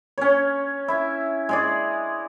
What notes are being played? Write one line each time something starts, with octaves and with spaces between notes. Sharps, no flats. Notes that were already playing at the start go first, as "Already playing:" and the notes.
C#4 C#5
E4 E5
G#3 G#4 D5